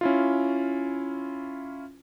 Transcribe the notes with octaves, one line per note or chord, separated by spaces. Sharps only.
C#4 E4 F4